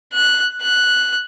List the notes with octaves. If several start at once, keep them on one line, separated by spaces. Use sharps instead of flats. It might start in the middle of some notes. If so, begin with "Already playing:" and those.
F#6
F#6